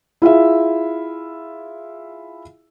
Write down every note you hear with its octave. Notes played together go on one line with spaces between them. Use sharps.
E4 F4 G#4 E5